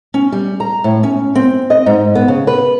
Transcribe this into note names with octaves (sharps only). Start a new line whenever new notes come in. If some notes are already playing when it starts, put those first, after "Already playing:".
C#4
G3
A#5
A2
C#4
C4
D#5
G#2
B3
C#3
B4